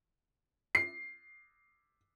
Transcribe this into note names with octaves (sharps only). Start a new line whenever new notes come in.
C7